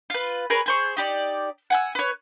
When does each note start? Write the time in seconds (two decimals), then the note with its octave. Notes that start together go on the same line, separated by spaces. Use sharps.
0.10 F4 B4
0.50 G#4 A#4 B4 C#5
0.66 G#4 C5 C#6
0.97 D#4 G4 D5
1.70 F#5 G#5 E6
1.95 B4 C#5